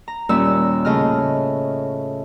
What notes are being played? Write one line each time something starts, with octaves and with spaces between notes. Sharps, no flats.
A#5
D#2 A#2 G3 C#4 E6
A2 C#3 D#5 F6